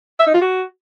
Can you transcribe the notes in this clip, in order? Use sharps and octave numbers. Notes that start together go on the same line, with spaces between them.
E5
D#4
F4
F#4